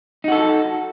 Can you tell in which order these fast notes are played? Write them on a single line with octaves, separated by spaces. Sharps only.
D#4 F#4 A4